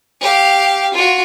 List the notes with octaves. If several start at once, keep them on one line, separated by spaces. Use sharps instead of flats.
G4 F5
F4 F#4